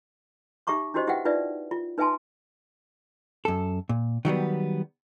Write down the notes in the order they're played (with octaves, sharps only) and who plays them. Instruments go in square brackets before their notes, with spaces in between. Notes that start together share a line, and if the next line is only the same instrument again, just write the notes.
[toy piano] D#4 G4 E5 A#5 C#6 D6
D4 E4 F#4 G4 C5 D#5
E4 G4 B4 E5 F#5 G5
D#4 F4 B4 D5 E5
F4
D#4 B4 E5 G#5 A5 C6
[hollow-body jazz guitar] F#2 A4
A#2
D#3 F#3 G3 B3